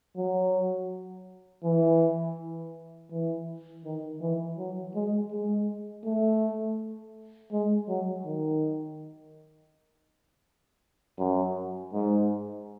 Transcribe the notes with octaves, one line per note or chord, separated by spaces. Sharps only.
F#3
E3
E3
D#3
E3
F#3
G#3
G#3
A3
G#3
F#3
D#3
F#2
G#2